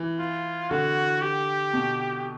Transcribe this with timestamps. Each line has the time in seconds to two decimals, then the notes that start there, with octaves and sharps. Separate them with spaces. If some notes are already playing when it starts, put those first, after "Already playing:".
Already playing: E3
0.19 F4
0.70 D3 F#4
1.22 G4
1.73 B2